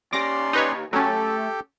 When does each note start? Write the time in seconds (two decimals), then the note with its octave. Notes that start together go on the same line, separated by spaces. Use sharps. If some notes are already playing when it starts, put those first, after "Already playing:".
0.13 D#2 C#4 G4 D5 C6 D6 A#6
0.53 D#4 B4 C#5
0.93 F#3 A3 C#4 G4 A4 G5 A5